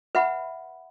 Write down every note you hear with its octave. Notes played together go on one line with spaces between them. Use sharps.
B4 E5 F#5 B5